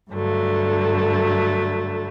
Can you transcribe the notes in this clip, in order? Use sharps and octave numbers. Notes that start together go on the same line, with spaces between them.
G2 D3 F#3 A3